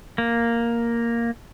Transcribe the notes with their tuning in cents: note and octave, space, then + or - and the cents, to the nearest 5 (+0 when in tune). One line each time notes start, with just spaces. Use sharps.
A#3 +0